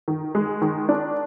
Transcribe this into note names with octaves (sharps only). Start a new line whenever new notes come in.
D#3
G#3
D#3
D4